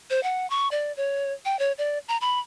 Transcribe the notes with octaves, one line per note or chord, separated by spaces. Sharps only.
C5
F#5
C#6
D5
C#5
G5
C#5
D5
A#5
B5